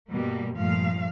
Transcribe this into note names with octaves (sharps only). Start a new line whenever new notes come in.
G2 B2 G3 A#3
G2 A#2 F3 A3 F5